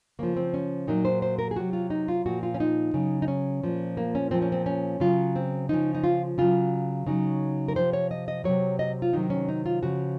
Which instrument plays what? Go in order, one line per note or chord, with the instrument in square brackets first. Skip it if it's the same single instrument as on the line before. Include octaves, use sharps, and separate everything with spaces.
[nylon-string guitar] C#3 F3 A#3
C4
C#4
A#2 F#3 D#4
C5
C5
A#4
G#4
C3 F#3 F#4
F4
D#4
F4
A#2 F3 F#4
F4
C#4
D#4
C#3 F#3
D#4
C#4
A#2 F3
A#3
C#4
A#2 F3 C4
C#4
C4
C#4
C#3 F#3 F4
C4
C#3 F3 D#4
D#4
F4
C#3 F#3 F4
C#3 F#3 D#4
A#4
C3 F3 C5
C#5
D#5
D#5
C3 D#3 F#3 C#5
D#5
F4
C3 D#3 F#3 D#4
C#4
D#4
F4
C#3 F3 F#4